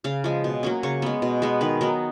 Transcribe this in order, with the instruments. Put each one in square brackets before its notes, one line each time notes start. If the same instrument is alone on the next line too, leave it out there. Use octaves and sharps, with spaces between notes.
[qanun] C#3 F5
F3 G#3
B2
F#3 A#3 C#4
C#3 C#5
G#3 B3
B2
G#3 B3
D#3 B4
F#3 B3 D#4 A#4